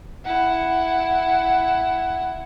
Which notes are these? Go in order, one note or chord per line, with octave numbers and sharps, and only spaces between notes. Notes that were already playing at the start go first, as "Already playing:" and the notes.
E4 F#5